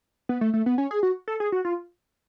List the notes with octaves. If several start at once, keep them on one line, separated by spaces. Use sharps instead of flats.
B3
A3
A3
B3
C#4
G#4
F#4
A4
G#4
F#4
F4